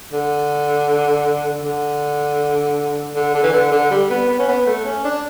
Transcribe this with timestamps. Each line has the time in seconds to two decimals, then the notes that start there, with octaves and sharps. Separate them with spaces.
0.12 D3
1.64 D3
3.15 D3
3.35 D3
3.43 E3
3.53 D3
3.72 D3
3.91 G3
4.10 B3
4.29 B3
4.39 C#4
4.48 B3
4.67 A3
4.85 C#4
5.04 D4